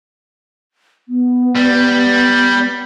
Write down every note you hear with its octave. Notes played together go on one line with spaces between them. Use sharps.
B3
G3